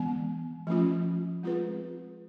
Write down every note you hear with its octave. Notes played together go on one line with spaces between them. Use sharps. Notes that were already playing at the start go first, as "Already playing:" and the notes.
Already playing: E3 G#3 B3
F3 A3 C#4 F4
G#3 C4 F4 G#4 B4